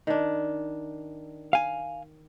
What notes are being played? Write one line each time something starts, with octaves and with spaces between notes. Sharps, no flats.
D#3 D4
F5 G#5